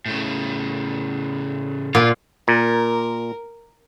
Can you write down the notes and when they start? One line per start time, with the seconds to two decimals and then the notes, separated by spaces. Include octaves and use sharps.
0.06 A2 C#3
1.95 A#2 F4
2.48 A#2 A#4